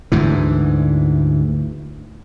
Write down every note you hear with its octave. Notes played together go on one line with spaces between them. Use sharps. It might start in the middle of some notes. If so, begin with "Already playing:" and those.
D2 G#2 E3